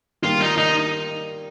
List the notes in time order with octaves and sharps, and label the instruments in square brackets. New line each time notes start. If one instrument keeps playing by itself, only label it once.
[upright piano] D#3 G3 A#3 [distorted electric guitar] F4
[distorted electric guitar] D#4
D#4